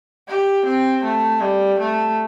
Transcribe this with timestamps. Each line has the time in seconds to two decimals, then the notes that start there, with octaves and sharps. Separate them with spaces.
0.28 G4
0.66 C4
1.04 A3
1.41 G3
1.79 A3